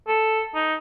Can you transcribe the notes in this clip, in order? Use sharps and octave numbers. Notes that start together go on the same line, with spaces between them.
A4
D#4